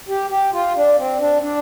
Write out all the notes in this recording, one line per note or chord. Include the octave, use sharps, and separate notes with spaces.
G4
G4
F4
D4
C4
D4
D4